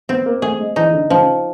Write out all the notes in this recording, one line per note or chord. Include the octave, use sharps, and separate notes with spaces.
B3 C4
A#3
A3 G#4
G#3
E3 D#4
D3
C#3 F3